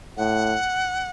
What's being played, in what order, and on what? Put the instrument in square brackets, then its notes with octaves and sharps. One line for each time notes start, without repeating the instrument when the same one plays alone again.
[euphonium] A2 [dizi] F#5